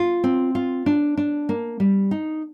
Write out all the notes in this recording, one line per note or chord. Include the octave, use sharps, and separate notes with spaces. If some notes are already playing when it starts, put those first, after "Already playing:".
Already playing: F4
C4
F4
D4
D4
A#3
G3
D#4